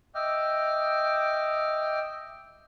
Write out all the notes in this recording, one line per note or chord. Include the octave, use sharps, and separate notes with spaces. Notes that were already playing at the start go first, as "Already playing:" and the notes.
D#5 E5 G5 D6 F6